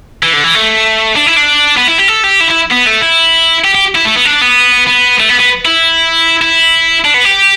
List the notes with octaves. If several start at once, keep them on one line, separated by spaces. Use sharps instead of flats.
E3
D3
E3
A3
D4
E4
D4
B3
E4
G4
A4
G4
E4
E4
B3
A3
E4
G4
G4
E4
A3
B3
D4
B3
B3
A3
B3
B3
E4
E4
D4
B3
G4